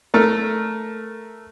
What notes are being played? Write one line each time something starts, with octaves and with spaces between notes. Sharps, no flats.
A3 A4 A#4